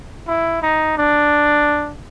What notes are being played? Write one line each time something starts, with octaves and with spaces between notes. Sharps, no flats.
E4
D#4
D4